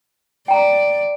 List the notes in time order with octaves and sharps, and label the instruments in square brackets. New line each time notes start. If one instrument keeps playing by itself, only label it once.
[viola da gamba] D5 [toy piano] G5 A#5